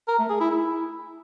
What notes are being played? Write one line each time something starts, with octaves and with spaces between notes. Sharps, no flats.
A#4
A3
G#4
E4
E4